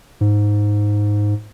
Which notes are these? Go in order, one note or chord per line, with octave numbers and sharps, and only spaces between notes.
G#2